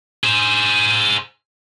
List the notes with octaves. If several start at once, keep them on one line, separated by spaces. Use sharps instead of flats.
G#4 C5